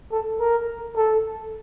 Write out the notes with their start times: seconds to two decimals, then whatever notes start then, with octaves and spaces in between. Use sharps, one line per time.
0.12 A4
0.40 A#4
0.96 A4